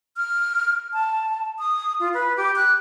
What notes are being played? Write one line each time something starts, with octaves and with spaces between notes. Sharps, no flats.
F6
A5
D#6
F4
B4
G4
F#6